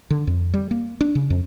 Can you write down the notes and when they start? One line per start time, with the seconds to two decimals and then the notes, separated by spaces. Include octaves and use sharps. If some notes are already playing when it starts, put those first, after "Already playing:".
0.10 D3
0.27 F2
0.54 G3
0.71 A#3
1.01 D4
1.15 C#3
1.30 F2